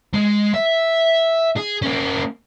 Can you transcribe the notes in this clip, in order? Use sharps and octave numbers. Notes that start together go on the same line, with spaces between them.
G#3
E5
G#4
A#3 C#4